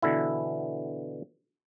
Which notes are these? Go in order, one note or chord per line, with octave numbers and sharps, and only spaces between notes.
B2 D3 E3 E4